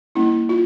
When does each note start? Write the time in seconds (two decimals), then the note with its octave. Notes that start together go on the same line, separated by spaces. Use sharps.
0.15 G3 A#3 C#4 E4
0.49 F4